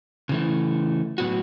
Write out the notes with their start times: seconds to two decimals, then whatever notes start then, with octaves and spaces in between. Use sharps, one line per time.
0.29 C#3 E3 A3
1.18 A2 F#3 B3 F#4